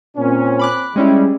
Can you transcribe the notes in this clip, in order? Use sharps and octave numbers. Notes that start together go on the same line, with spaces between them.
A#2 C4 C#4
B5 D6 F#6
G3 G#3 C#4 E4